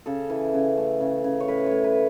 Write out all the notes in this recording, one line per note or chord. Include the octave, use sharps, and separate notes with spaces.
C#3 A4
E3
C#3
A3
C#3
C#3
C#5
A2 B4
C#5
A2
B4